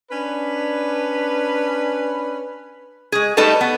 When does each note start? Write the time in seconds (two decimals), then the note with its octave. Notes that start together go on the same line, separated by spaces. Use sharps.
0.11 C#4 D4 B4
3.12 G#3 G#4
3.37 G3 A3 D#4 A4 B4 A5
3.61 B3